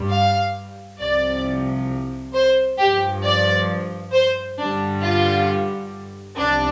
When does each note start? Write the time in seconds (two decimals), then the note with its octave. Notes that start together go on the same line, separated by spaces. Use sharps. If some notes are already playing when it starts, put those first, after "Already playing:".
Already playing: G2 G3
0.09 F5
0.99 C2 C3 F3 D5
2.33 C5
2.78 G2 F3 G4
3.24 D5
4.12 C5
4.58 G2 D3 G3 D4
5.03 F4
6.37 C2 C3 F3 D4